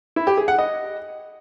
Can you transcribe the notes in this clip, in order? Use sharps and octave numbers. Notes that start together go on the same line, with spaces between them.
E4
G4
G#4
F#5
D#5